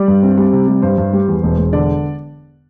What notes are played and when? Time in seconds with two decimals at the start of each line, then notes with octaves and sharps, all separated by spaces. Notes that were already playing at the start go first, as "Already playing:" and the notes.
Already playing: G3 D5
0.08 G2
0.23 C4
0.37 G3
0.53 C3
0.68 G3
0.82 G2 C5
0.98 G2
1.13 G3
1.28 E2
1.43 E1
1.58 E1
1.73 D3 D5